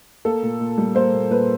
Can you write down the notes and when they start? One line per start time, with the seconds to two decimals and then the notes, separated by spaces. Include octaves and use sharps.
0.25 A#3 A4
0.43 A#2
0.60 A#2
0.78 G3
0.95 A#3 C5
1.13 A#2
1.30 A#2 B4